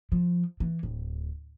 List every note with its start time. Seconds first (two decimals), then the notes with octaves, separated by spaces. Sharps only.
0.12 F3
0.60 E3
0.83 D1